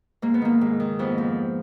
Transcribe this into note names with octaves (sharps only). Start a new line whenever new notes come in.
G#2 A#3
B3
D#3 A#3
G#2
D#3
F2 B3
F3